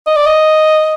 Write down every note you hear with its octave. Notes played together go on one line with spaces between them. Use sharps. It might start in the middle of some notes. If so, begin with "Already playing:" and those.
D#5
D5
D#5